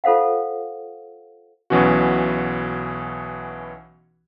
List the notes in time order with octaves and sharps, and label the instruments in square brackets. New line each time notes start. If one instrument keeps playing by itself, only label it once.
[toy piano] F4 A4 C5 F5 F#5
[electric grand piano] B1 B2 E3 C#4 F#4